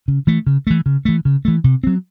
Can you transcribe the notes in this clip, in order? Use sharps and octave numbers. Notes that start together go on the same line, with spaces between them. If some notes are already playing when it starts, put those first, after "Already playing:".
C#3
E3 A3
C#3
E3 A3
C#3
E3 A3
C#3
E3 A3
C3
F#3 C4